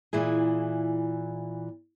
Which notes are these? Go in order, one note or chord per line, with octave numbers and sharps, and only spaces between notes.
A#2 E3 E4 G#4